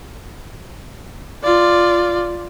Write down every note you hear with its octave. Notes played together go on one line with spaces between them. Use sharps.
F4 D5